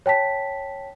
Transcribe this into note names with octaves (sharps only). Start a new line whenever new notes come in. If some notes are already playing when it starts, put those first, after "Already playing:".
C#5 G5 A5 B6